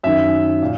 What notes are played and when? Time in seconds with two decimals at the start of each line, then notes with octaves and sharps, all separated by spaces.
0.04 F#2 D#3 E5
0.62 A#2